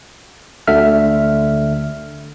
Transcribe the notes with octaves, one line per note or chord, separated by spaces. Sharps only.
D2 D3 E5 F6